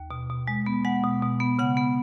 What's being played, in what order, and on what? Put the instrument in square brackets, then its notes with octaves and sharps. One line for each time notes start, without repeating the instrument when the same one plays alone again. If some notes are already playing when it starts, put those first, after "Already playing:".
Already playing: [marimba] D#2
B2
B2
G#3
B3
G#3 F#5
B2
B2
B3
C#3 F#5
B3